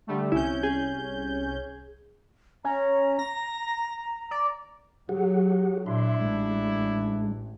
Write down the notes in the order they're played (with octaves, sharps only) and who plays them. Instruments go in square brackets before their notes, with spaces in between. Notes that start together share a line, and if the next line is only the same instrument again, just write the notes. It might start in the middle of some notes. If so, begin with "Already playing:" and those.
[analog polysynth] D3 G3 A3
[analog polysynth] C2 C#4 G6 [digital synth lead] E4
[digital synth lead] G#4
[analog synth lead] C#4 [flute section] A#5
[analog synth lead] A#6
D5
[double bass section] F#3 [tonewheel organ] G4 G#4 F#5
[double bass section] A#2 [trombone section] D4 E4 [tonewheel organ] E5 C6
[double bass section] A1 [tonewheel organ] G#3